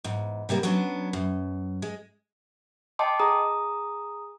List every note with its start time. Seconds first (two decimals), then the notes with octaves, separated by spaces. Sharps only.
0.04 E2 G#2
0.49 C3 G3 A#3 B3
0.63 F#3 B3 C#4 D4
1.13 F#2
1.82 G#3
2.99 D#5 G5 A5 C6 D6
3.20 G#4 A#5 D#6